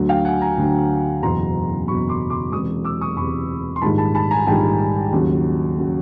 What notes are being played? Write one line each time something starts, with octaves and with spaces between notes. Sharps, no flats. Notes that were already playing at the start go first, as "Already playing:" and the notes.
Already playing: D2 D3 F#3
F5 G5
F#5 G#5
G#5 A#5
D2 D3 F#3
F#1 E2 B2 F#3 A#5 C6
F#1 E2 B2 F#3 B5 C#6
C6 D6
C6 D6
E1 E2 C3 C#6 D#6
D6 E6
C#6 D#6
E1 E2 C3 B5 C#6
C6
A#1 G#2 D#3 G3 A5 B5
A5 B5
A5 B5
G#5 A#5
A#1 G#2 D#3 G3 G5 A5
D#2 C#3 F#3
C#3 F#3